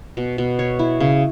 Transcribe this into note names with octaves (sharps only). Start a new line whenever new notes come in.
B2
B2
C#5
E4
C#3